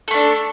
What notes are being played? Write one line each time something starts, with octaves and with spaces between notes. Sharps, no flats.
A3 D4 A4